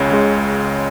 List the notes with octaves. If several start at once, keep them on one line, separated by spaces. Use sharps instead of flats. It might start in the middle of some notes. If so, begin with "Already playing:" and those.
Already playing: C#2 C#3 G#3 C#5
C#3 G#3